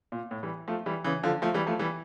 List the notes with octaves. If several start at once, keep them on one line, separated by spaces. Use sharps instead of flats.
A#2
A2
E3 G3
F3 A3
E3 G3
C#3 E3
D3 F3
F3 A3
E3 G3
F3 A3
E3 G3